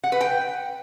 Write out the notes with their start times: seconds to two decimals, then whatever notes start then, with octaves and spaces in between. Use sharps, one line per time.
0.04 F#5
0.12 B4
0.21 G5